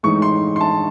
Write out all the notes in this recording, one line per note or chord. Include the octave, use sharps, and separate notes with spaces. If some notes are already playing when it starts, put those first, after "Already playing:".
A2 E3 G#3 D#4 C#6
C6
C6
A5